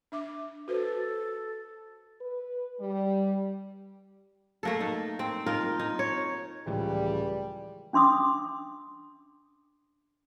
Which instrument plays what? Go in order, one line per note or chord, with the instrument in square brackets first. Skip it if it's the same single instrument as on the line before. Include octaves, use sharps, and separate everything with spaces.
[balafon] D4 E5 D6
[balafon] F#4 B4 C5 [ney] A4
[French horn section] B4
G3
[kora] A3 A#3 A4
D#4
C4
D#4 F4 A#4
D#4
C#5
[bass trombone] C#2 [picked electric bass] A2 E3 F3 [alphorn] G3
[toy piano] C#4 D4 C6 D6 D#6